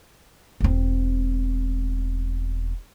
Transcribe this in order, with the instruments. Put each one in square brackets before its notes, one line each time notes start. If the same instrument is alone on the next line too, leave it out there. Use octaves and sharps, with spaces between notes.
[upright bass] E1 C4